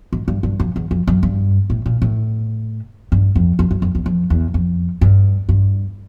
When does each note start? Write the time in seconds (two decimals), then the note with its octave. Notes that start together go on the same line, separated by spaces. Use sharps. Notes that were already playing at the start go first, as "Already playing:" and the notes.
0.13 G#2
0.28 G2
0.43 G2
0.60 F2
0.76 E2
0.91 F2
1.07 F#2
1.23 G2
1.70 A2
1.86 A#2
2.02 A2
3.12 G2
3.35 F2
3.59 F2
3.71 F#2
3.82 F2
3.95 E2
4.06 F2
4.30 E2
4.54 F2
5.01 G2
5.49 G2